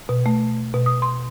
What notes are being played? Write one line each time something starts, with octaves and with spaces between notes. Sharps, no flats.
B2
A3
B2
D#6
C6